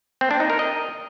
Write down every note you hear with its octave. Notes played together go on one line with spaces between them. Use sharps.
C4
D4
D#4
A#4
D#5